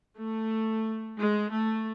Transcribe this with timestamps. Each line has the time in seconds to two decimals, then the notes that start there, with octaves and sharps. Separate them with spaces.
0.18 A3
1.18 G#3
1.51 A3